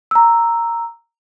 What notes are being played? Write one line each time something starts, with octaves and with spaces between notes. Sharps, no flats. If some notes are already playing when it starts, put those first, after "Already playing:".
A#5 E6